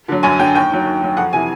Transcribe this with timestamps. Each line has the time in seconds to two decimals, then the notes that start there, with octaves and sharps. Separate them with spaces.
0.08 D3 F#3
0.23 F#2 G#5
0.39 D3 F#3 G5
0.55 D#2 G5
0.71 D#3 F#3
0.86 D#2
1.02 D#3 F#3
1.17 F2 F#5
1.33 C3 E3 G#5